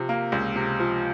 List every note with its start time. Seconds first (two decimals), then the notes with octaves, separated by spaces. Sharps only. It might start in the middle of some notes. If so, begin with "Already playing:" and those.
Already playing: C3 F3
0.09 A#3
0.32 C#2
0.56 C3
0.80 F3